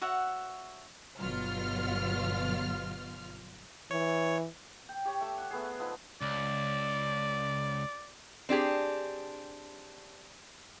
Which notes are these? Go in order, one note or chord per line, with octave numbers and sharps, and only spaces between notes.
F#4 C#5 E5 F#5
G1 B2 F#3 F4 F6
E3 C#5
G5
G4 C#5
A3 E6
F#5 E6
A3 B3 G#4
F3 A3 B3 D#4
C#2 D5
C4 D4 G4 G#4